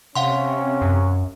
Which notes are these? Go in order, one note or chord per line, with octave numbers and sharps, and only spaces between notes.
C3 C#4 F5 F#5 C6
F#2